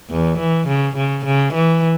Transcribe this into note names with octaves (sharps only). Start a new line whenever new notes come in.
E2
E3
C#3
C#3
C#3
E3